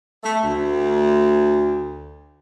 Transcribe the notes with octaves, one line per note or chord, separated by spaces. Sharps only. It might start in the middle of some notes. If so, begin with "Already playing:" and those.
A3
D2